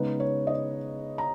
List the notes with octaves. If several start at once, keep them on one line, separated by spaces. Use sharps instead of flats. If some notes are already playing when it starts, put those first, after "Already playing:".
Already playing: C#3 G#3 B3 D#4 B4
C#5
D#5
A#5